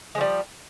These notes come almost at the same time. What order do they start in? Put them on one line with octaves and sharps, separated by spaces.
G#3 F3 G3